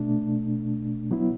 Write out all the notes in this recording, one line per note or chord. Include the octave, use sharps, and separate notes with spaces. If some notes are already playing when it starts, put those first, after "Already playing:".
Already playing: B2 A3 D4
F#3 B3 E4